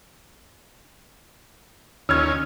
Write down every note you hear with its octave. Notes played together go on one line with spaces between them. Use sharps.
D#2 C#4 E6 F6 G#6